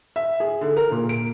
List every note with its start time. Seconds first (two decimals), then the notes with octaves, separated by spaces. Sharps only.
0.16 E5
0.40 G#4
0.61 D3
0.76 A#4
0.91 A#2
1.09 D7